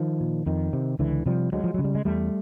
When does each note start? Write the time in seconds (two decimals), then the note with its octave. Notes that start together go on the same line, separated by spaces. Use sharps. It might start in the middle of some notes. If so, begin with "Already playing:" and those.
Already playing: D#3 F3
0.20 A#2
0.46 F2 D#3
0.73 C3
0.99 C#2 D3 E3
1.26 C3 F3 G3
1.52 D2 F#3 G#3
1.64 F3
1.74 C#3 F#3
1.84 G3
1.95 G#3
2.05 E2 G3 A3